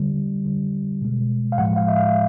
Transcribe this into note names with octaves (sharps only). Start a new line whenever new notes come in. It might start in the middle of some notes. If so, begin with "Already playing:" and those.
Already playing: D3 G3
D3 G3
B2 G#3
F5
A2 F3 G#3 F#5
F5
E5
F5